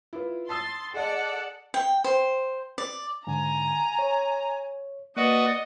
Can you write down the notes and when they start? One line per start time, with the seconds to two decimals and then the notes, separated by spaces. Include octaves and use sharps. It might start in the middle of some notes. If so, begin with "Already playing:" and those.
0.13 E4 F4 B4
0.49 A5 C6 D#6 E6 A6
0.94 G#4 A4 D5 D#5 F#5
1.74 G5
2.04 C5
2.78 D5
3.27 G#2 D3 G#5 A#5
3.99 C#5
5.17 A#3 F#4 B4 D5 D#5 F#5